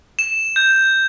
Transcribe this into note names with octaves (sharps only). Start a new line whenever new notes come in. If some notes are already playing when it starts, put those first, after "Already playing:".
E7
G6